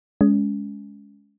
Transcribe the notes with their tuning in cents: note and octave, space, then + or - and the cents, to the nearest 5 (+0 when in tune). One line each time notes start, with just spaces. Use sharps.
G#3 +0 C#4 +25